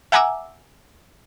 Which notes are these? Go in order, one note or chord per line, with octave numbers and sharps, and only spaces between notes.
E5 F#5 G#5 A#5 D6 E6